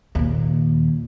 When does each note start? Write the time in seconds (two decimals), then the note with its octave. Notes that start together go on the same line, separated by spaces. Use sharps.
0.15 D#2 A#2